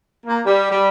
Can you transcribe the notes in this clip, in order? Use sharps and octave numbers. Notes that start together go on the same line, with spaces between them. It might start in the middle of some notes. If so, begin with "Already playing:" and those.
A#3
G3
G3